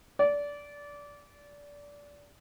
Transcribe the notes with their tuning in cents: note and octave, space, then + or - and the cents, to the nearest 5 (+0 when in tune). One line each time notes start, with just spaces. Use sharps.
D5 -20